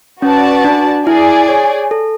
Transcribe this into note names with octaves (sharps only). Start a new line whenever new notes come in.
C#4 F#4 B4 D5 A5
D4
E4 G#4 D5 G#5
C#5
A4